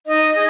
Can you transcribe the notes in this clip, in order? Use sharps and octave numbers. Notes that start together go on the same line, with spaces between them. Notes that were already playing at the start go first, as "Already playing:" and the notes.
D#4 D#5
G#4